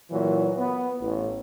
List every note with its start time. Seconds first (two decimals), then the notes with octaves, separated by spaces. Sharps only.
0.10 A#2 E3 F#3
0.58 B3
1.01 A1